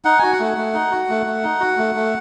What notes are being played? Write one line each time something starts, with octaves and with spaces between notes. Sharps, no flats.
D#4 F#5
F#4 G#5
F#5
A3
A3
D#4
F#4
A3
A3
D#4
F#4
A3
A3